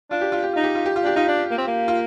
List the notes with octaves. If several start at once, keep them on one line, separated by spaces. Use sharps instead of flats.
D4 F4
G4
F4
G4
D#4 F4
G4
F4
G4
F4
D4 G4
D#4 F4
D4
A#3
C4
A#3
F4